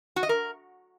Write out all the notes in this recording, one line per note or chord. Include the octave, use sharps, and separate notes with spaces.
F#4
D#5
A#4